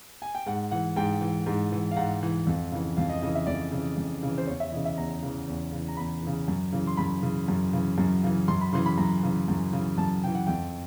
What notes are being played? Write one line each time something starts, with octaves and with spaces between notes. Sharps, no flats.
G#5
G5
G#2 F#5
E3 F#5
G#2 G5
E3
G#2
E3
F5
G#2 F#5
E3
F2
C#3 E3
F2 F5
D#5
C#3 E3 D#5
E5
F2 D5
C#3 E3
F2
C#3 E3
C5
E2 C#5
E5
C#3 E3 D#5
E5
E2 A#5
C#3 E3
E2
C#3 E3
A#5
E2 B5
C#3 E3
F#2
C#3 E3
C6
F#2 B5
C#3 E3
F#2
C#3 E3
F#2
C#3 E3
F#2 C6
B5
C#3 E3 C6
B5
F#2 A#5
C#3 E3
F#2
C#3 E3
F#2 A5
C#3 E3 G5
F#5
F2 G5